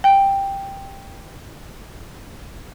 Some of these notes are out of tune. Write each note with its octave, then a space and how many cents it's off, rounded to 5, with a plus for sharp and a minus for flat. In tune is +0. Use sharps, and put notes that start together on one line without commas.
G5 +5